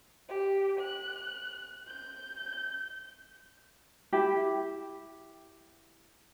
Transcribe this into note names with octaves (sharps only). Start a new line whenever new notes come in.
G4
F#6
G6
E4 G4